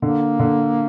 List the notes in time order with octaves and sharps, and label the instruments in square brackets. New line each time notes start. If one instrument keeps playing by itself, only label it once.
[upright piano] D3 [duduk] A#3
[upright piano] D3